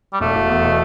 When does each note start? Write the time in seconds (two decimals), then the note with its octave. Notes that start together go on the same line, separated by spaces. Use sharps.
0.13 G3
0.20 E1 A3
0.35 E1
0.49 E2
0.64 B2